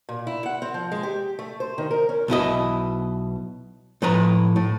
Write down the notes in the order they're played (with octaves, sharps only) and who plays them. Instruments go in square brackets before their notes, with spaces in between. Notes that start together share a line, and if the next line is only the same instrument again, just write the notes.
[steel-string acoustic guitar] A#2
E4
F#5
C4
F3
G#3
G4
A3
C5
D#3
A#4
C#4
[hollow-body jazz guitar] B1 B2 E4 D#5
A2 F3 B4 A#5
A2